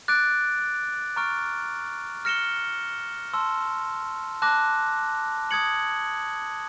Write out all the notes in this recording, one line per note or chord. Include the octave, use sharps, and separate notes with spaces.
D6 F#6 A6 D7
A#5 C#6 F6 A6 D7
F6 A#6 C#7 E7 G7
A5 C6 E6
A5 D6 F#6 A#6
D#6 G#6 C#7 F#7